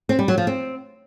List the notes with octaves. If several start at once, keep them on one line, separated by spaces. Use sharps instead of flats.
C4
G3
F#3
F3
C4